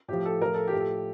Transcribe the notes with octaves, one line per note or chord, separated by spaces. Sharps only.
A2 F3 G4
A4
A2 F3 A#4
A4
G4
A2 F3
A4